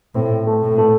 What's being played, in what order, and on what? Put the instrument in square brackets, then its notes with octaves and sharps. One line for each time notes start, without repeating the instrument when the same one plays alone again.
[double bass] A2 [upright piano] C4
[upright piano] A3
[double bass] A2
[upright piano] A3